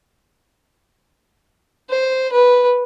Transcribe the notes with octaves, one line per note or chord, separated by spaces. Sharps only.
C5
B4